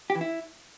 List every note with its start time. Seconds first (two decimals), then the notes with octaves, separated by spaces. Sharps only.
0.10 G4
0.15 E3
0.21 E4